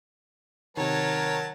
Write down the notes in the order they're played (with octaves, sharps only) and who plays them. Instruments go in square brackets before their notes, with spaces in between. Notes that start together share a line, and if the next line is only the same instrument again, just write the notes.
[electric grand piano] C3 D#3 [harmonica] F#3 A5 [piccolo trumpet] A#4 [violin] C#5